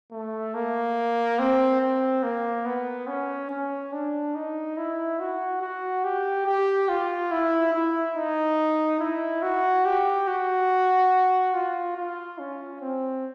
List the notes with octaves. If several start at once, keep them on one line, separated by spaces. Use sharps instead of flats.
A3
A#3
C4
C4
A#3
B3
C#4
C#4
D4
D#4
E4
F#4
F#4
G4
G4
F4
E4
E4
D#4
E4
F#4
G4
F#4
F4
F4
C#4
C4